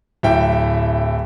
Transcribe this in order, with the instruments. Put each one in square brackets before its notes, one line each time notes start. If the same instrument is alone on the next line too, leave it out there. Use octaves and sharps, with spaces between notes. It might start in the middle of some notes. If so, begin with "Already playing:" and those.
[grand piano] D1 E4 G5